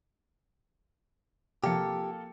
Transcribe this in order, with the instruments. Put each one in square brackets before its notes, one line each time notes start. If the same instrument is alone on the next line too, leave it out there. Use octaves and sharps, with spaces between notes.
[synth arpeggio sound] C3 F3 [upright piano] A#3 A4 C#7 [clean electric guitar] G4